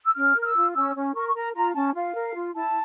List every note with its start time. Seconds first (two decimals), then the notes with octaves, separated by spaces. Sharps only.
0.06 E6
0.15 C#4 F6
0.36 A#4
0.42 F6
0.45 E6
0.55 F4
0.75 C#4 E6
0.95 C#4
1.14 A#4 C#6
1.27 C#6
1.34 A#4 A#5
1.54 F4 A#5
1.74 C#4 A5
1.94 F4 F5
2.14 A#4
2.34 F4
2.53 E4 A5